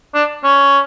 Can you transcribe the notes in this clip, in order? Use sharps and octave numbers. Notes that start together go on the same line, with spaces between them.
D4
C#4